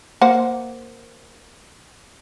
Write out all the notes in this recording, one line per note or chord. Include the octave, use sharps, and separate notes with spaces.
A#3 C5 F#5